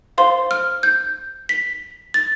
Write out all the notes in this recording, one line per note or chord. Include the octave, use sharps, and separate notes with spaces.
C5 F5 C6
F6
G6
B6
A6